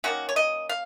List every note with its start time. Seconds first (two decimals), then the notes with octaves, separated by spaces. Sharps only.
0.04 D#3 A#3 C#4 F#4
0.29 C#5
0.36 D#5
0.69 F5